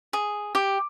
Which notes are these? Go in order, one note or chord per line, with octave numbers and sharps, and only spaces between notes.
G#4
G4